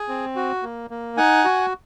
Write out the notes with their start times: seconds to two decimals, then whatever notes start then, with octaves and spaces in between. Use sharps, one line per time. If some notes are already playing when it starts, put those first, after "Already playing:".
Already playing: G#4
0.08 C4
0.36 F#4
0.63 A#3
0.90 A#3
1.17 D#4 F#5 G#5
1.45 F#4